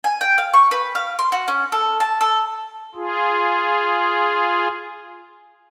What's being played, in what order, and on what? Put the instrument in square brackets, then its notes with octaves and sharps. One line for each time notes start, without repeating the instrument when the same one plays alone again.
[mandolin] G#5
G5
F5
C#6
B4
F5
C6
F#4
C#4
A4
A5
A4
[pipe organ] F4 G#4